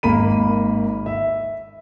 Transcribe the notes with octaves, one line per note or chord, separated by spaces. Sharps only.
G#1 A#3 B5 D#7
E5